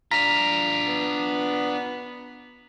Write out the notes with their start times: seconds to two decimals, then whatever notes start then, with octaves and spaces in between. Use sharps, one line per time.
0.11 D4 F4 A#5 B6 F7
0.86 B3